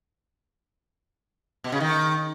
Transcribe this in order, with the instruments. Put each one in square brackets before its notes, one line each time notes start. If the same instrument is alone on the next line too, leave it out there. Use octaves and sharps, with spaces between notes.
[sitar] B2
C#3
D#3